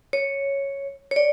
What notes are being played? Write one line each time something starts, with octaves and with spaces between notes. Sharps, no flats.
C#5
C#5
D5